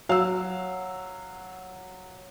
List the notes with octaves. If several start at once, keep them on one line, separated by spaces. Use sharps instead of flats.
F#3 F5 E6